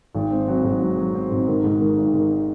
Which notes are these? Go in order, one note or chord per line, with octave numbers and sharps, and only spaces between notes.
G#1
C4
F#3
G#2
F#3
F#3
C4
G#2
D#3
G#2
D#3
G#1
D#3